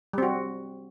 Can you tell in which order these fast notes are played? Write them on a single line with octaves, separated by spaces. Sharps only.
G3 C4 F#4